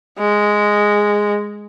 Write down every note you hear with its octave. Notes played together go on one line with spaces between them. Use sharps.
G#3